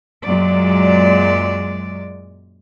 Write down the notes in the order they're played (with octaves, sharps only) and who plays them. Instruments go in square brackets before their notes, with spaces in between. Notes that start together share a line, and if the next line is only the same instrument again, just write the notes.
[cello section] F#2 A#2 F#3 G#3 D5